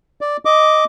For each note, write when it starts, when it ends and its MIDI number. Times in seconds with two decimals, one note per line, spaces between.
0.21 0.37 74
0.45 0.84 75
0.45 0.84 86